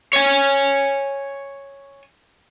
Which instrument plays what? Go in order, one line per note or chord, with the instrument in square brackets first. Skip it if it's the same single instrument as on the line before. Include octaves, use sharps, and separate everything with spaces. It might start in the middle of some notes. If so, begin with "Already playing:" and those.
[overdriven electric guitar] C#5 G#5